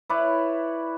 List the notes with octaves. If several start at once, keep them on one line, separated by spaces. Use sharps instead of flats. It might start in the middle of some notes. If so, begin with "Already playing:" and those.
E4 B4 C#5 D5